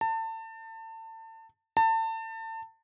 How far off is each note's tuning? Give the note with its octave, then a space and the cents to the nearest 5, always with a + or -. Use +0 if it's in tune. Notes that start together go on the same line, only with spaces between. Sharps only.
A5 +30
A5 +30